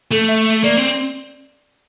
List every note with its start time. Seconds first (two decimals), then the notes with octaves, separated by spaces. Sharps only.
0.11 A3 A4
0.28 E5
0.63 A#3 D5
0.77 C4